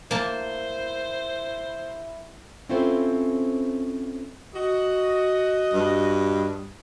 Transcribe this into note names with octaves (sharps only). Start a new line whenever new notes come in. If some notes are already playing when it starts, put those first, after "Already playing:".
A#3 E4 C5 A5
C4 C#4 E4 F4 A4 C5
F#4 D#5
G2